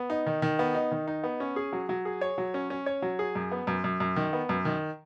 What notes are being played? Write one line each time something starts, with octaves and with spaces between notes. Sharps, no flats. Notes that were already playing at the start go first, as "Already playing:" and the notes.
Already playing: B3
D#4
D#3
D#3
B3
D#4
D#3
D#4
B3
C#4
G#4
F#3
F#3
G#4
C#5
F#3
C#4
C#4
C#5
F#3
G#4
F#2
B3
F#2
F#2
F#2
D#3
B3
F#2
D#3